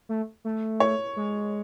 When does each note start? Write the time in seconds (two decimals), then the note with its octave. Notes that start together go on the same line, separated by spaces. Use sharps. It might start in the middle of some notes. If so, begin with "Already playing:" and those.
0.09 A3
0.45 A3
0.80 C#5
1.16 G#3